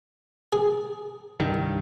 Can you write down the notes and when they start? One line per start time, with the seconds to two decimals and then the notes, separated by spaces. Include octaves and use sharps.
0.53 G#4
1.40 C2 G2 D#3